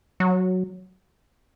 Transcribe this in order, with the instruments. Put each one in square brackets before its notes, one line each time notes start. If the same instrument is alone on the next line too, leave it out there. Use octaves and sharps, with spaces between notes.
[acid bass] F#3